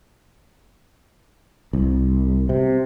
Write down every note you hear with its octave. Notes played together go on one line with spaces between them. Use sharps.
C2
C3